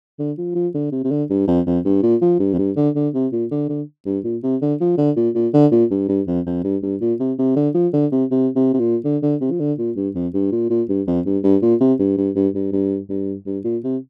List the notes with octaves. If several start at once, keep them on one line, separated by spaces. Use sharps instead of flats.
D3
F3
F3
D3
C3
C3
D3
G2
F2
F2
G2
A#2
F3
G2
F2
G2
D3
D3
C3
A#2
D3
D3
G2
A#2
C3
D3
F3
D3
A#2
A#2
D3
A#2
G2
G2
F2
F2
G2
G2
A#2
C3
C3
D3
F3
D3
C3
C3
C3
C3
A#2
D3
D3
C3
F3
D3
A#2
G2
F2
G2
A#2
A#2
G2
F2
G2
G2
A#2
C3
G2
G2
G2
G2
G2
G2
G2
A#2
C3